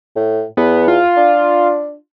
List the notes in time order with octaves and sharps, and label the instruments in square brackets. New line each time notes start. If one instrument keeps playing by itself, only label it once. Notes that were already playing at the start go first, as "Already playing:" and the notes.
[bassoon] A2
[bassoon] E2 [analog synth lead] B3
[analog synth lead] F4
[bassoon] D4